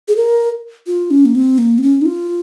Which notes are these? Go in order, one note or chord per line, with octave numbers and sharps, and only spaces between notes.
G#4
A#4
F4
C#4
A#3
C4
A#3
C4
C#4
D#4
F4